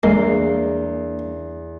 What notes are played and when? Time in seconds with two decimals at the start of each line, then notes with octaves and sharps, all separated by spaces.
0.03 E2 G#3 A#3 D4 A#4 C7